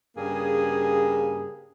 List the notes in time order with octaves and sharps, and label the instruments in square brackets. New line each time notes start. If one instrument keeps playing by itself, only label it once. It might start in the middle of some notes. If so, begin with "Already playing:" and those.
[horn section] G2 C#3 A#3 G#4